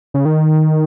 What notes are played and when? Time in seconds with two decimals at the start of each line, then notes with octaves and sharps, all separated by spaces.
0.14 C#3
0.25 D#3